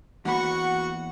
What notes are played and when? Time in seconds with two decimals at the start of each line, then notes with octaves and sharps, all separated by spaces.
0.25 E2 A#3 F#4 F#5 B5 C#6